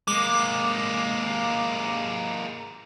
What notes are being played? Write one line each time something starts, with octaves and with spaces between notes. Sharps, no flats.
G#3 A#3 D6